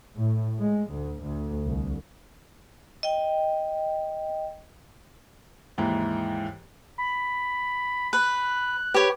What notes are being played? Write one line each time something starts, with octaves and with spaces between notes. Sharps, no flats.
A2
G#3
D2
D2
C2
D#5 G5
D#2 G#2 E3
B5
B4 F#6
G4 B4 C#5